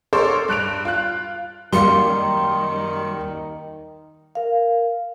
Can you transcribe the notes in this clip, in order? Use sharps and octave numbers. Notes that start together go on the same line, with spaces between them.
A4 A#4 C5 C#5 C6 D6
G2 F#6 D7 F7
F4 F#6
F#2 D#3 G3 A#3 F5 C6 C#7
A#4 F5